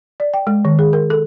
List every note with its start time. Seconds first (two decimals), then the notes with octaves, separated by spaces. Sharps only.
0.20 D5
0.34 G5
0.47 G#3
0.65 D#3
0.79 G#4
0.93 A#4
1.10 A4